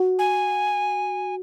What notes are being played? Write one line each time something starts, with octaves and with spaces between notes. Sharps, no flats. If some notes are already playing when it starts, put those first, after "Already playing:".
Already playing: F#4
G#5